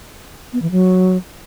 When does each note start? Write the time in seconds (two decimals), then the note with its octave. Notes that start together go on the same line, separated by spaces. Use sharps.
0.53 B3
0.62 E3
0.71 F#3